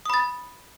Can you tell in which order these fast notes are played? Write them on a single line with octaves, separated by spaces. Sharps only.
D#6 B5 A6